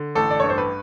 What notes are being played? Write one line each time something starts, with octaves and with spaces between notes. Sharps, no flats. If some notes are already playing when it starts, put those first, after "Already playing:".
Already playing: D3
A1 A4
D5
C#5
G2
C5
B4